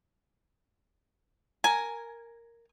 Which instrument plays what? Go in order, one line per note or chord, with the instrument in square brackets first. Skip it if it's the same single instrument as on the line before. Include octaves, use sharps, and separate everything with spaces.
[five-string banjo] A#4 [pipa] G#5